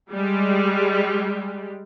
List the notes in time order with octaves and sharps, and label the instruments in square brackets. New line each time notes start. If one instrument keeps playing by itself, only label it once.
[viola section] G3 G#3